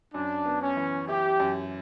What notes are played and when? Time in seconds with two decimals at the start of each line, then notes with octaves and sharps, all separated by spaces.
0.14 F#2 D4
0.46 B3
0.62 C#4
0.77 E3
1.08 E4 G4
1.40 F#2